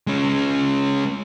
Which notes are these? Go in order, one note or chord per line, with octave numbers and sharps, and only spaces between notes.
G#3 C#4